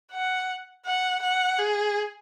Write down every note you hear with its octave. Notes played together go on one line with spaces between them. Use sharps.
F#5
F#5
F#5
G#4